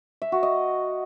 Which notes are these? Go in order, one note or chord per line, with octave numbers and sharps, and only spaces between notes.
E5
F#4
D#5